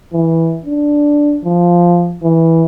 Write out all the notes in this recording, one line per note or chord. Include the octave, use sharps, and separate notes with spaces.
E3
D4
F3
E3